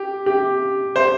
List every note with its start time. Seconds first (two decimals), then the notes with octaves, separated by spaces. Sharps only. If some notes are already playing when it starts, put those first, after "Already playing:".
Already playing: G4
0.26 G4
0.96 C5